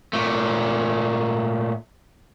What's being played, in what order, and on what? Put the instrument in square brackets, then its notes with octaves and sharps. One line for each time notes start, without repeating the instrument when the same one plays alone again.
[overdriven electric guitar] A#2 A3